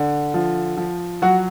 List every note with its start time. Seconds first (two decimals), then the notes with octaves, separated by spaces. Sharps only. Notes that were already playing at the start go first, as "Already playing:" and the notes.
Already playing: D3
0.34 F3
0.77 F3
1.22 F#3 F#4